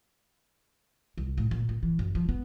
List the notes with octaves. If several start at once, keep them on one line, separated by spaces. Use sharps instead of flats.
C2
A2
A#2
A#2
E3
F#2
F3
B3